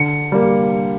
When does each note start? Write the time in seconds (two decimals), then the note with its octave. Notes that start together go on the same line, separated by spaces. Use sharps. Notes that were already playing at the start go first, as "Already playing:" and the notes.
Already playing: D3 C#7
0.32 G3 A#3